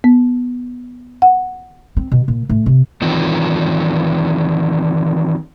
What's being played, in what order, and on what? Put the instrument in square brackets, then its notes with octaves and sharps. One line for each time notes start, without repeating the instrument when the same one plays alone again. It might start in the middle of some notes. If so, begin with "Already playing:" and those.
[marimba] B3
F#5
[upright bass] C4
B2
A#2
A2
C3
[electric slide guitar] D#3 E3 F#3 C4 D#4 F4